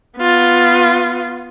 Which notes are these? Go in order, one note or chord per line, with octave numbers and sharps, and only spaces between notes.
B3 F4